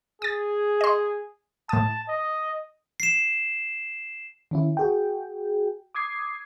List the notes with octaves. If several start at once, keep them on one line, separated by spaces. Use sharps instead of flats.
G#4 D#6 A6
D#5 C6
A2 A5 D#6
D#5
C7 E7
D#3 C#4 E4
F#4 G#4 G5
D6 D#6 G#6 C7